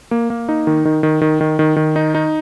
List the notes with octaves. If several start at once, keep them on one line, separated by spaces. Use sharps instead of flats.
A#3
A#3
D#4
D#3
D#3
D#3
D#3
D#3
D#3
D#3
D#4
D#4